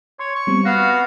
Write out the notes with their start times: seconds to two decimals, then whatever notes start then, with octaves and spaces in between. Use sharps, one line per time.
0.19 C#5 C6
0.35 C#6
0.47 G3 B3 C4
0.65 B3 F#4 F5 A#6